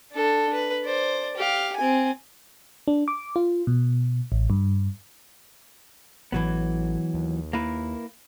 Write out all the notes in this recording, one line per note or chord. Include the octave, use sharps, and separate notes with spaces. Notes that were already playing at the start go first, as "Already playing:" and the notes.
D4 A4
B4
C5 D5
G4 F5
C4 G#5
D4
D6
F4
B2
A1
G2
A1 E3 F#3 B3
D#2
A#3 E4 B4